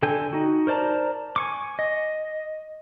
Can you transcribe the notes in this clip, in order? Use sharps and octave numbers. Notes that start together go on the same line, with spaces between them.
D3 A4 G5 G#5
D#4 F#4
A#4 C5 D5 A5 A#5
G#5 C#6 D6
D#5